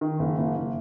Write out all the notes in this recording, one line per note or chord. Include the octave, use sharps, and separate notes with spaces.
D#3
F#1
F#1
F#1